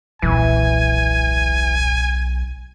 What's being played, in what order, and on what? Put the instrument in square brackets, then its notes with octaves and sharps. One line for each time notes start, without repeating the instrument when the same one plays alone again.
[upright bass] D#1 A#2 [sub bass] B1 [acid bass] E3 [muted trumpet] G#5